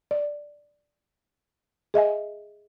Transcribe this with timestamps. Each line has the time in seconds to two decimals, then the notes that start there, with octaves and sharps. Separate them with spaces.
0.11 D5
1.94 G#4 D#5 E5 G#5